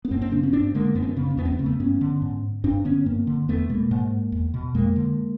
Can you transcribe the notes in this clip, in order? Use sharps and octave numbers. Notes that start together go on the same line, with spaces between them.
B3
F#2 A#3 C4
A#3 C4
C#3 C4 D4
B3 C#4
G2 C4 D4
D3 G#3 A#3
F#2 B3
C4
B3
C#3 C4
B3
C4
E2 B3
C4
B3
C#3 C4
A3 B3
G2 B3 C#4
D3
G#2
G2 C4 D4
D3 B3 C#4
G2 A#3 C4
D3
E2 A3 B3
B2 G#3 A#3
G#2
E2
B2
F2 G#3 A#3
D3